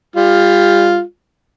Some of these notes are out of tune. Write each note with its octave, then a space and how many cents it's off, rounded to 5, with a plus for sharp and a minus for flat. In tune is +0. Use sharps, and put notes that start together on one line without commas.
G3 +30 F4 +0